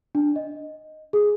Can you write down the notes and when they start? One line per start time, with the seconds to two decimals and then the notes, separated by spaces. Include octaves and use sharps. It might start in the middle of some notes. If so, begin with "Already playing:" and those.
0.15 D4
0.36 D#5
1.13 G#4